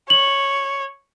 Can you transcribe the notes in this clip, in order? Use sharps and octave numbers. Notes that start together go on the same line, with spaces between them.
C#5 F#7